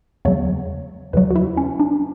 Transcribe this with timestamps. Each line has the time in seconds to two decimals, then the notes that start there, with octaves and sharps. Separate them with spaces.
0.25 E2 C#3 F#3 C#5
1.13 E2 C#3 F#3 B4
1.31 F#4
1.36 E4
1.57 C#4
1.80 D4